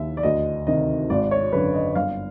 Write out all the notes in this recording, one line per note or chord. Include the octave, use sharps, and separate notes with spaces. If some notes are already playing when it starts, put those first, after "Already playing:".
Already playing: D#2 E5
D5
D2 D#5
C3 D#3 D#5
G#1 D5
C#5
F#2 D3 B4
D#5
G1 F5